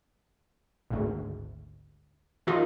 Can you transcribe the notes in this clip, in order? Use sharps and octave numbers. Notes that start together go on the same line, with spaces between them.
G#1 D2 G#2
D#3 F3 D#4 F4